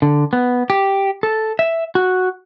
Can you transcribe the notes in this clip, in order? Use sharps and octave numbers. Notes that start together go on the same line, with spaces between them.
D3
B3
G4
A4
E5
F#4